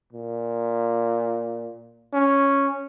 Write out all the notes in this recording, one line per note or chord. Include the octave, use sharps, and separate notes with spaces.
A#2
C#4